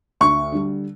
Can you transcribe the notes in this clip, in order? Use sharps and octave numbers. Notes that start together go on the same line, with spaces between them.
D2 C#6
D3 G3